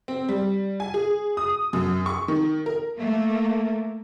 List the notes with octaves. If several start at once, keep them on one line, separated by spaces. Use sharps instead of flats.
C4
G3
G#5
G#4
D#6
F#2
C#6
D#3
A#4
A3 A#3